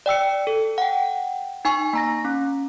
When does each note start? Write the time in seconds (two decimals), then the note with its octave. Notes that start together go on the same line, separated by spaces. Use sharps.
0.06 D5 G5 E6 C#7
0.47 A4
0.78 F#5 G5
1.65 D#4 G#5 C#6
1.93 A#3 A#5 A#6
2.25 C#4